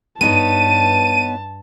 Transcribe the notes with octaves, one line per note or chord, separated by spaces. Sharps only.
G2 B3 D#4 C#5 A5 D#7